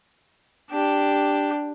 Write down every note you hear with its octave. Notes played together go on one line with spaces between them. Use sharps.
D4 G4